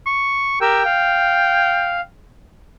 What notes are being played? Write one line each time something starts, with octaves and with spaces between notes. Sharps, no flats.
C#6
G4 A#4 G5 E6
F5